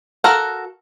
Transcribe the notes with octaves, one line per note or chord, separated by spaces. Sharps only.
F#4 A4 A#4 F5 F#5